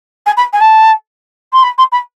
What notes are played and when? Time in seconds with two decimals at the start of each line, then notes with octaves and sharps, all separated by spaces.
0.26 G#5
0.37 B5
0.53 G#5
0.60 A5
1.53 C6
1.63 B5
1.78 C6
1.92 B5